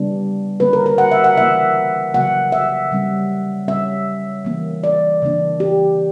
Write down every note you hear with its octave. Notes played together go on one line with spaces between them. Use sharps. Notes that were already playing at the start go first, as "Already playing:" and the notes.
Already playing: C#3 G3 B3 D4
D3 A#3 C#4 B4
A#4
A#4
F#5
E5
F#5
C#3 E3 A#3 E5
C#3 F#3 A#3 F#5
E5
C#3 G3 C#4
C#3 G3 C#4 E5
E3 A#3 C#4
D5
C#3 E3 A#3 D4
G4